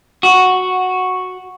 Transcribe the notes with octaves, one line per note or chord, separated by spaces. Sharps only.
F#4